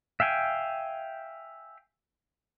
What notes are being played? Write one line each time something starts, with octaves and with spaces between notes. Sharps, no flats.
E5 F5 G5 G#5